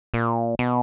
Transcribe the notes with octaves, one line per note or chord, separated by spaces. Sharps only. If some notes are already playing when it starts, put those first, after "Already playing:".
A#2
B2